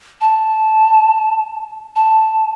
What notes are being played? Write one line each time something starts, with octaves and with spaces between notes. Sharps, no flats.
A5
A5